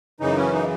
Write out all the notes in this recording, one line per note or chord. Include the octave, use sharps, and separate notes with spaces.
F#2 C#3 E3 D#4
C#4
D#4